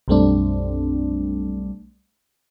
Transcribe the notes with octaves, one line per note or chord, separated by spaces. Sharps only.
B1 F#2 G3 A3 C4 D4